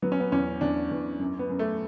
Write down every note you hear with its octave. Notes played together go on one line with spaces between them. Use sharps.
F#3 B3
C#4
B3
E2 C#4
E2 D4
E2
F#2
B3
F#2
A3